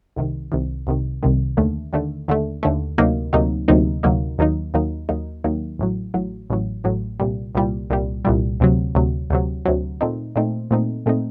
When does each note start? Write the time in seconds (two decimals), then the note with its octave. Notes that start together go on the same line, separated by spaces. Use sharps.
0.16 C2 C3 D#3
0.52 C2 C3 D#3
0.87 C2 C3 D#3
1.23 C2 C3 D#3
1.57 D#2 D3 A3
1.93 D#2 D3 A3
2.28 D#2 D3 A3
2.63 D#2 D3 A3
2.98 D2 C3 F#3 A#3 D#4
3.33 D2 C3 F#3 A#3 D#4
3.68 D2 C3 F#3 A#3 D#4
4.03 D2 C3 F#3 A#3 D#4
4.38 D#2 D#3 F#3 A#3 D#4
4.74 D#2 D#3 F#3 A#3 D#4
5.09 D#2 D#3 F#3 A#3 D#4
5.44 D#2 D#3 F#3 A#3 D#4
5.79 A1 A2 F#3
6.14 A1 A2 F#3
6.50 A1 A2 F#3
6.84 A1 A2 F#3
7.20 C2 A#2 G3
7.55 C2 A#2 G3
7.90 C2 A#2 G3
8.25 C2 A#2 G3
8.60 D2 C3 F#3
8.95 D2 C3 F#3
9.30 D2 C3 F#3
9.66 D2 C3 F#3
10.01 A#2 A3 C4 D#4
10.36 A#2 A3 C4 D#4
10.71 A#2 A3 C4 D#4
11.06 A#2 A3 C4 D#4